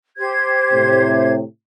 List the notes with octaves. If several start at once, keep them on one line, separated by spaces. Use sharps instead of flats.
G4 C5 G#6
A2 C3